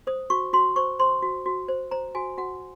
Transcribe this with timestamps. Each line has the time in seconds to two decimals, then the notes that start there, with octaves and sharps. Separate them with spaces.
0.07 C5 D#6
0.30 F#4 C#6
0.53 F#4 C6
0.76 C5 C#6
0.99 C5 C6
1.23 F#4
1.46 F#4
1.68 C5
1.91 C5 A#5
2.15 F#4 G#5
2.38 F#4 F#5